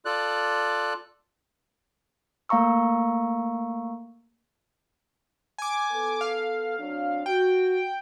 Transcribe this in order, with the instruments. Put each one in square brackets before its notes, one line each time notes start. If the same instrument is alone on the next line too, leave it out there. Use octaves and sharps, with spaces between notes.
[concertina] F4 A4 D5 F#6
[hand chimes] A3 A#3 F5 A#5 C#6 E6
[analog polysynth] G#5 D6
[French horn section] B3 A4
[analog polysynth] F5
[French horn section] F#3 C4 D4
[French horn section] F#4 [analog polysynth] G5